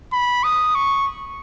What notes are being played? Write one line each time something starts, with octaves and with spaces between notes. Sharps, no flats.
B5
D#6
C#6